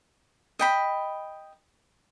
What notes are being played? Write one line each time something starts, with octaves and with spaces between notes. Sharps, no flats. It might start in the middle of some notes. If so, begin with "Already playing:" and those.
D#5 G5 B5